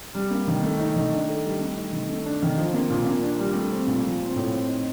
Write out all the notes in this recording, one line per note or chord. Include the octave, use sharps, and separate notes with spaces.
G3
A#3
D#3
A3
D#4
D#3
D4
A4
G3
A3
D#4
D#3
A3
D4
D#3
F3
A#3
A#2
A#3
D4
G3
A3
C4
A#2
F3
C4
A2
C4
D#4